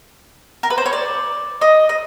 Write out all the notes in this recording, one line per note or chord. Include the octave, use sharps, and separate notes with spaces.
A#4
B4
C5
C#5
D5
D#5
D#5